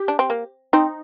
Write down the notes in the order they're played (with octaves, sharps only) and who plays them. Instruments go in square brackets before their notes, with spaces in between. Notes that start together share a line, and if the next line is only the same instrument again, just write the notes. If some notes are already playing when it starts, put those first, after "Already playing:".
Already playing: [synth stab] G4
[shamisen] D4
C4
A#3
[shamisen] C4 [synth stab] D#4